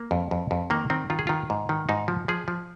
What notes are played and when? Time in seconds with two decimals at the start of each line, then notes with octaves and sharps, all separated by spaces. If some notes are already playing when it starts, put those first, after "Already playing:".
Already playing: A#3
0.11 F2
0.31 F2
0.51 F2
0.70 D#3 A#3
0.90 D#3 C4
1.10 D#3 F4
1.19 G#4
1.27 D#3 F4
1.50 G#2
1.69 D#3
1.89 G#2 D#4
2.08 F3
2.28 F3 G#4
2.48 F3